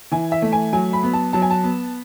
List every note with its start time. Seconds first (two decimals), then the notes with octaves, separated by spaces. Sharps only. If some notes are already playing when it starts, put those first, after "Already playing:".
0.11 E3 G#5
0.32 E5
0.42 A3
0.52 G#5
0.73 F#3 G#5
0.93 B5
1.03 B3
1.13 A5
1.33 F#3 A5
1.42 G#5
1.50 A5
1.63 B3